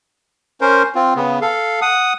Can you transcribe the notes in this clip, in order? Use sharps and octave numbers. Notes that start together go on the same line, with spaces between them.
C#4 A#4 C5
C4 F4
C#3 B3
A4 F5
F#5 D#6